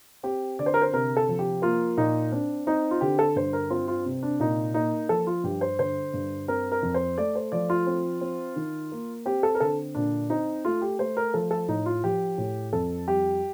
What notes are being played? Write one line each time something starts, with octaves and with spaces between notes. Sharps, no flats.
C4 G4
D3 D5
C5
A#4
C5
C3 A#4
A4
F3
G4
A#3 F4
A#2 D#4
C4 D4
C4 D#4
F4
D3 G4
A4
G2 C5
A#4
C4 F4
F4
C3
D4
A#2 D#4
A#3 D#4
F3 A4
F4
G2 G4
C5
D3 C5
G2
C4 A#4
A#4
F2
C5
A3 D5
C5
F3 D5
F4
C4
C4
D#3
A#3
C4 G4
A4
A#4
D3 A4
A#2 D4
C4 D#4
A3 F4
G4
A3 C5
A#4
F3 A4
A4
A2 D#4
F4
F3 G4
A2
F2 A4
G3 G4